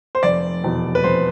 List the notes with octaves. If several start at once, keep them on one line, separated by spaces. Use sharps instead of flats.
C5
F1 D5
E2 B2
B4
F1 C5